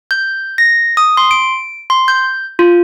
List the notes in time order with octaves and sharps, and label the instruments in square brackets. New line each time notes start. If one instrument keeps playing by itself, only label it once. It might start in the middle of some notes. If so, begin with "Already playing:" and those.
[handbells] G6
A#6
D#6
C6
D7
C6
G6
F4